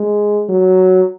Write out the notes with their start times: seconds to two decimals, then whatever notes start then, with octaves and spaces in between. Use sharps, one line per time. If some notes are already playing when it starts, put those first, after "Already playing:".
Already playing: G#3
0.49 F#3